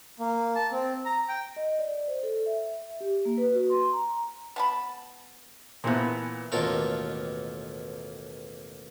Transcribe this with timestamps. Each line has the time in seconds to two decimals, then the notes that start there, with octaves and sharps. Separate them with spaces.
0.19 A#3
0.55 A5
0.72 C4
1.06 A#5
1.29 G5
1.56 D#5
1.79 D5
2.08 C5
2.23 A4
2.46 E5
3.01 G4
3.25 A#3
3.38 B4
3.52 F#4
3.70 C6
3.93 A#5
4.56 B3 A5 B5
5.84 A#2 E3 F3 B3 C4
6.52 A1 D#2 B2 F4 A4 A#4